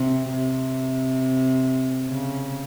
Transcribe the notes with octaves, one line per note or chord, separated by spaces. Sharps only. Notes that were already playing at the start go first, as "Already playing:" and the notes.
Already playing: C3
C3
C#3